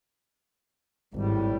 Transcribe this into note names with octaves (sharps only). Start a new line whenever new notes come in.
G#1 A2 G3